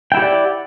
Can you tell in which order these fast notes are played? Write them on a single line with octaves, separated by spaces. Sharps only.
G5 E4 G4 F#5 D5